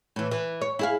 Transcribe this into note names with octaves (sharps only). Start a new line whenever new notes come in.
A2 E3
E3
C#5
E4 G#4 F5